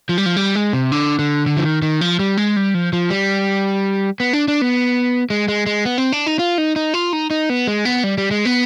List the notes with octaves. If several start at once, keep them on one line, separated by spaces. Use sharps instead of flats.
F3
G3
F3
G3
G#3
C3
D3
D3
D3
F3
D#3
D#3
F3
G3
G#3
G3
F3
F3
G3
B3
D4
D4
B3
G#3
G#3
G#3
B3
C4
D4
D#4
F4
D#4
D#4
F4
D#4
D#4
B3
G#3
B3
G3
G3
G#3
B3